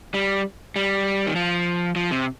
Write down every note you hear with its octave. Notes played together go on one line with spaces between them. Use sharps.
G3
G3
D#3
F3
F3
C3